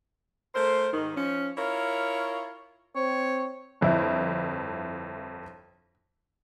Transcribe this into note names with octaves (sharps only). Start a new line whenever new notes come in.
A3 A#4 C5
G#2 D#3
F3 C#4
E4 F4 A#4 C#5
C4 C#5
G1 F2 E4